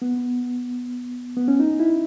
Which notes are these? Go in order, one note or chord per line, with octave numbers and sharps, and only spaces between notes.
B3
B3
C#4
D#4
E4